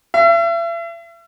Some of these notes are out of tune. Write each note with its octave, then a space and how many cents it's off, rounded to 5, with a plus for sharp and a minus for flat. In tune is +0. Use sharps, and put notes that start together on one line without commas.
E5 +40